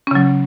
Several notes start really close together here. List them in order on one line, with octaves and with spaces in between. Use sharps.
C#4 C#3 F#3